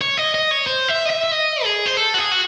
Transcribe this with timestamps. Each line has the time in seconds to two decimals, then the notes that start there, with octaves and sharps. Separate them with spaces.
0.01 C#5
0.17 D#5
0.34 D#5
0.51 C#5
0.67 C5
0.88 E5
1.05 D#5
1.10 E5
1.23 E5
1.32 D#5
1.64 G#4
1.86 C5
1.97 A4
2.14 F#4
2.18 G#4
2.31 F#4